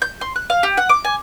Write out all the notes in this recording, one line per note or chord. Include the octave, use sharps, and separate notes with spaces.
G6
C6
F#6
F5
G4
F#5
D6
G#5